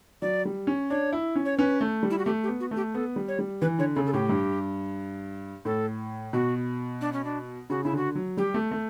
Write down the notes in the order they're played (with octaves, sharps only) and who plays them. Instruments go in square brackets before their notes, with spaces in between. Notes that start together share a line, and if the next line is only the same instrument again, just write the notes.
[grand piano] F#3 [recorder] D5
[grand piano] G3
C#4
[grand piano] D4 [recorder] C#5
[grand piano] E4
C#4
[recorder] C#5
[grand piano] C#4 [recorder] B4
[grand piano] A3
G3
[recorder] E4
F#4
[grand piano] A3 [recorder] G4
[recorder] G4
[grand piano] B3
[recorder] F#4
[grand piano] A3
[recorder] G4
[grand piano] B3 [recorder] A4
[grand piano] G3
[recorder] C#5
[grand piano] G3
[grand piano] E3 [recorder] B4
[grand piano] D3 [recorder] C#5
[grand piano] C#3 [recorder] A4
[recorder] A4
[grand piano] A2 [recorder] G4
[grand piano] G2
[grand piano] A2 [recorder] A4
[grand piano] B2 [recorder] F#4
[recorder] D4
C#4
D4
[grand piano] C#3 [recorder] F#4
[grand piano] C#3 [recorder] E4
[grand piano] D3 [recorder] F#4
[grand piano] F#3
[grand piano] G3 [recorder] G4
[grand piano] A3
A3